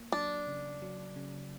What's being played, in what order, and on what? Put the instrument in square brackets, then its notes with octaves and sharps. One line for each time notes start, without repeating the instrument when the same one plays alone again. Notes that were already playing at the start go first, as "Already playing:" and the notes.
Already playing: [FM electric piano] A#3
[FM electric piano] F#3 [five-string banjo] D4
[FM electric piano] C#3
F#3
C#3